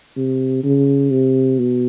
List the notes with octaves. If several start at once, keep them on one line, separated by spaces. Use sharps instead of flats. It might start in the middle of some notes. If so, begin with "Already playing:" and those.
C3
C#3
C3
B2